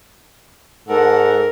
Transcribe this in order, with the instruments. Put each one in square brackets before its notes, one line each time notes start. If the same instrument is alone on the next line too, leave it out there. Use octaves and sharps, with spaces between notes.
[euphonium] G#2 [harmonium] A4 F#5 [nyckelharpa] A#4